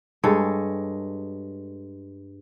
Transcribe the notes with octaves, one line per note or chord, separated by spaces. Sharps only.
G2 G#3 A4 C#5